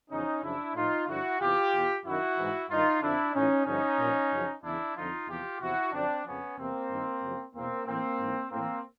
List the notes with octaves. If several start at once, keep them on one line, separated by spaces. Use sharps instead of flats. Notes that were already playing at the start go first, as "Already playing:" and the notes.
E2 C#3 F3 C#4 D#4
F#2 C#3 F3 D4 E4
A2 F3 D#4 F4
G2 D3 F3 E4 F#4
E2 C3 E3 F4 G4
E2 B2
F#2 D#3 E4 F#4
G#2 E3
G2 D#3 D#4 F4
F2 D3 F3 D4 E4
A2 E3 C#4 D#4
G2 D3 F3 C#4 D#4
A#2 F3
F#2 C#3 F3
E2 C#3 E3 D4 E4
F2 D3 F3 D#4 F4
E2 C3 F3 F4 G4
E2 C3 F3 E4 F#4
F#2 D3 F3 C4 D4
F2 C#3 F3 B3 C#4
E2 C3 E3 A#3 C4
G2 D#3
F#2 C#3 F3
E2 B2 A#3 C4
A2 E3 A#3 C4
G#2 E3
A2 E3 A#3 C4